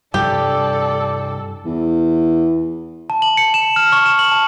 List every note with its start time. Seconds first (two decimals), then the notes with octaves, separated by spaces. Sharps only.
0.14 G2 C3 G3 G4 A4 D5
1.65 E2
3.10 A5
3.22 F#7
3.37 C#7
3.54 E7
3.76 F6
3.92 C#6
4.06 E7
4.19 F#7
4.32 A5